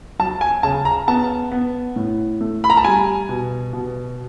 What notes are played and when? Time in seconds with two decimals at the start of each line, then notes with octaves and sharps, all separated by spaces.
0.19 F#3 A5
0.41 G#5
0.63 C#3 A5
0.85 A#5
1.08 B3 A5
1.52 B3
1.96 A2
2.41 A3
2.64 B5
2.70 A#5
2.77 A5
2.84 G3 G#5
3.29 B2
3.73 B2